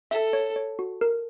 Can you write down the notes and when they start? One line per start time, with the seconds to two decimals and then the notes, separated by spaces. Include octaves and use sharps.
0.11 A4 E5
0.33 C#5
0.56 C#5
0.79 F#4
1.01 A#4